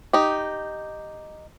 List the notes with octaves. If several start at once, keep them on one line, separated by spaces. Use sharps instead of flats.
D#4 G4